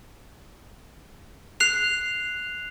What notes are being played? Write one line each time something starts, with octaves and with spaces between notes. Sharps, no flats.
F#6 C7 F7